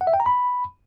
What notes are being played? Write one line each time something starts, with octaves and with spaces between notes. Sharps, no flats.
F#5
E5
G5
A#5
B5